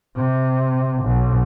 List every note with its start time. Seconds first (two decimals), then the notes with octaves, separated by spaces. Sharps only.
0.15 C3
1.03 B1